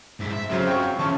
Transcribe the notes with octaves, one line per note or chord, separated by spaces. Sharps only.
G#2 E4
E5
C#3 F#3 C4 F4 C5
G5 C#6
E3 F3 C#4 A5 C#6